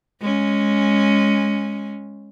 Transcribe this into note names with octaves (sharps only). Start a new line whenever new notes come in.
G#3 C#4